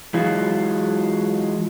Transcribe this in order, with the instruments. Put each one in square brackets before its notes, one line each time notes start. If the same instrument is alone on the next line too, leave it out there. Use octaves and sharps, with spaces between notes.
[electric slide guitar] E3 F#3 G#3 F4 F#4